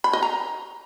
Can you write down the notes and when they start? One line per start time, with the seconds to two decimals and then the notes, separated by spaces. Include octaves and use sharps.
0.04 B5
0.13 D#5
0.23 A#5